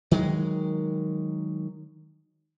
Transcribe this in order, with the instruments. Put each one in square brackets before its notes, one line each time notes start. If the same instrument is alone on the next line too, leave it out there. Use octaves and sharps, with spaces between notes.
[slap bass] D#3 F#3 G#3